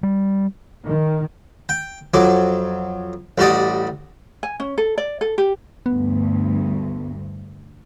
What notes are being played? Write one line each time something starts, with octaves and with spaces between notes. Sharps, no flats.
G3
D#3
G5
F2 F#3 D6
A1 G3 F#4 D5 D#5
G#5
C#4
A4
D5
A4
G4
D2 G2 B3